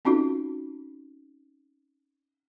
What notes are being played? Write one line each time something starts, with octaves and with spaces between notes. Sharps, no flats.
C4 C#4 D#4 F4 F#4 A4